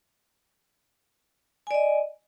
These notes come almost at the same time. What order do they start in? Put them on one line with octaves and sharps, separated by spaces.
G#5 D5 D#5